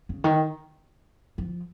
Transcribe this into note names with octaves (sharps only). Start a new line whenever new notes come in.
C#3
D#3
F3